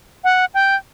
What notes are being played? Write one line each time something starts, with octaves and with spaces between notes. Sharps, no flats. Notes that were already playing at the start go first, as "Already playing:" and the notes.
F#5
G5